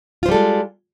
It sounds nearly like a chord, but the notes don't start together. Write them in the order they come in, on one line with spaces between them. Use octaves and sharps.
F4 C5 G3 A4 G#3